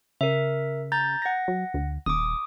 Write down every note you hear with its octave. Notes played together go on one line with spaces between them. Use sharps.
C#3 A#4 E5
A#5 G6 A6
F#5 A#6
F#3
D2
D#1 D6 D#6